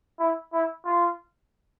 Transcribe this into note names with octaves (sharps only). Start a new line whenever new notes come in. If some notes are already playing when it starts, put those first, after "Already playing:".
E4
E4
F4